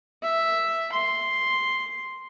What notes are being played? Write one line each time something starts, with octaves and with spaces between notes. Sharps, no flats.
E5
C6